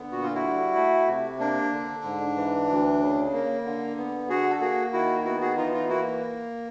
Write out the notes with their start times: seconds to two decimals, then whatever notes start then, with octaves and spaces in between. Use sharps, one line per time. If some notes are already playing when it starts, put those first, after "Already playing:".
Already playing: D3 B3
0.12 A#2 F#4
0.22 F4
0.35 E4 F#4
0.44 G3
0.76 A3
1.08 C3
1.39 A#3 D4
1.72 D3
2.04 G#2
2.36 E3
2.69 D2
3.01 C#3
3.33 A#3
3.65 D3
3.97 B3
4.28 D3 F#4 G#4
4.50 A4
4.61 A#3 F#4 G#4
4.93 D#3 E4 F#4
5.25 B3 E4 F#4
5.41 F#4 G#4
5.57 E3 D#4 F4
5.73 D#4 F4
5.89 A#3 E4 F#4